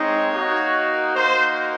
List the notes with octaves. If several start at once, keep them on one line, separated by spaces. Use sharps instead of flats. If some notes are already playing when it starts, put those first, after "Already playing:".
Already playing: G#3 C4 D#4 C#5
A#3 D#4 F#4
A#3 D#4 F#4 C5